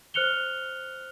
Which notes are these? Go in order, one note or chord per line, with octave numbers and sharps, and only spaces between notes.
C5 F6 F#6 C#7 F7 G7